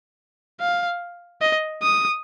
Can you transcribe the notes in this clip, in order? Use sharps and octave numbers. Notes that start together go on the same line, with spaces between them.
F5
D#5
D#6